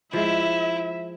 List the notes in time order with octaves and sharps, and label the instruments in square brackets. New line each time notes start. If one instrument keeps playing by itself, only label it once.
[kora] F3 G#3 [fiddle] E4 [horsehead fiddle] E5